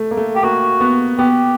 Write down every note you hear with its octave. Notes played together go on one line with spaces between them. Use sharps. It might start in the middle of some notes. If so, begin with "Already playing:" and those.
Already playing: A3
A#3
A3
G4
A#3 F#4
B3
B3 G4